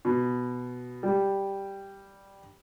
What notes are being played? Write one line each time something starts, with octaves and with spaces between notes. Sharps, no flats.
B2
G3